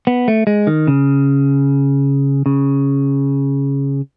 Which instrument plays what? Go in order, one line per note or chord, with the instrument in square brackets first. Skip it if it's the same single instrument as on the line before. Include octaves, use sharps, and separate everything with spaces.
[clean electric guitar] B3
A3
G#3
D#3
C#3
C#3